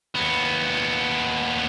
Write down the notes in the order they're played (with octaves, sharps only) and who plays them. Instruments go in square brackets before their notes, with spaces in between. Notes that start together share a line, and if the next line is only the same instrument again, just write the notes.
[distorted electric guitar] D#2 B3